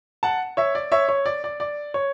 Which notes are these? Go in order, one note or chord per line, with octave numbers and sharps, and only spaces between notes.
F#5 A5
C#5 E5
D5
C#5 E5
C#5
D5
D5
D5
C#5